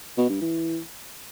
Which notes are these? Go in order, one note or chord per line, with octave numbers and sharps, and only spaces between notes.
B2
G2
E3